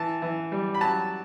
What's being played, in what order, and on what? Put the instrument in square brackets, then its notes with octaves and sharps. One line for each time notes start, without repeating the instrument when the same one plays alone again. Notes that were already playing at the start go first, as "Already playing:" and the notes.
Already playing: [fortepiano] E3 A5
E3
G3
B5
F#3 A5